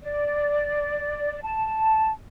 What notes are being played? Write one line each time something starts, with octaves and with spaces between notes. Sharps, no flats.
D5
A5